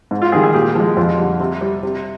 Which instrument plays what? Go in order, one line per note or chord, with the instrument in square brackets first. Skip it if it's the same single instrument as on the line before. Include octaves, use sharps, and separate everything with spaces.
[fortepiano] G#2
F4
D#3 G3 G#4
G#4
A#2 G4
F3 G#3
F2 F4
D3 G3
C3
G3
C3